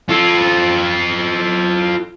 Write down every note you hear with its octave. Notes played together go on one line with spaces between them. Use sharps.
F4 A4